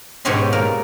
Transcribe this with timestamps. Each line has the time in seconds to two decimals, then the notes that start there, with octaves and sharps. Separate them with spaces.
0.25 G#2 B2 G4 C#5 D#5 C6
0.53 A#2 A#4